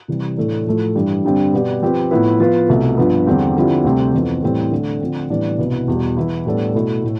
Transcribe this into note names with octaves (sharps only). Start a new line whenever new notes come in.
C3 E3 G3
A2 E3 A3 D4
A2 F3 A3
G2 E3 G3
G2 D3 G3 C4
B2 B3 D4 G4
F3 C4 G4 B4
A2 F3 B3 E4 B4
F3 B3 F4 B4
C2 B2 A3
G2 F3 B3
E2 D3 G3 C4 G4
D3 F3 C4 E4 G4
D2 C3 G3 C4 G4
F2 E3 B3
A2 E3 G3 C4
D3 A3 D4
D3 F3 C4
A2 E3 G3 B3 D4
C2 B2 B3 E4
E2 B2 G3
E3 B3 E4
A2 G3 B3 D4 A4
B2 A3 E4
A2